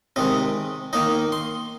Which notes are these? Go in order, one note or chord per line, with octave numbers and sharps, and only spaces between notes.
C3 D#3 G#3 D#5
D#3 A#3 D#4 D#5
C6